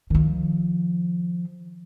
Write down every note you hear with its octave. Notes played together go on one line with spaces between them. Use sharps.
D#3 F3